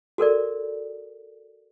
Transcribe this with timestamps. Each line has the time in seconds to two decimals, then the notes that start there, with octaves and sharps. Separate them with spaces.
0.18 F#4 A4 A#4 D5